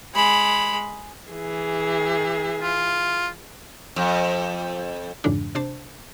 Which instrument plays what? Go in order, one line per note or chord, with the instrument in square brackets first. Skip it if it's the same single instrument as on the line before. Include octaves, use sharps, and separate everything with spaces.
[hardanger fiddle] G#3 B5
[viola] E3 G#4
[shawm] F4
[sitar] F2
[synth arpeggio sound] F2 G#2 C#3 E3 G#3 D4
C3 D4 C5 A5